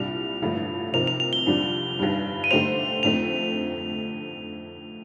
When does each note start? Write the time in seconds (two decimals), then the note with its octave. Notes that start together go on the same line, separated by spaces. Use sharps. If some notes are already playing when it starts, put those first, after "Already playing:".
Already playing: C2 A#2 G3 D4 F7
0.42 A1 G2 D3 F3 A3
0.93 C3 F3 C4 D#4 A#4 F7
1.07 F7
1.20 F7
1.33 G7
1.46 F2 D3 G3 D4 F4
1.99 G1 G2 D#3 G3
2.44 D#7
2.51 D3 A3 D#4 G4 C5 F7
3.03 F2 D3 A3 C4 D#4 F7